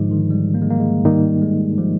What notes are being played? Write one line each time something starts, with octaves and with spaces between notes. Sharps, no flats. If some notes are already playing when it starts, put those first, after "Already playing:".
Already playing: G#2 D3 F3 G#3 D#4
D#3
G3
A#3
G#3
A#3
G#3
G#2 D#3 G3 A#3 D#4
G#3
F3